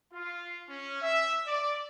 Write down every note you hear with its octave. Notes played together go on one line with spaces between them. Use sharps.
F4
C#4
E5
D5